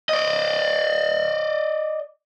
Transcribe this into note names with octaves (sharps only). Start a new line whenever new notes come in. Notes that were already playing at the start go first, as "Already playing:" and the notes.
D5 D#5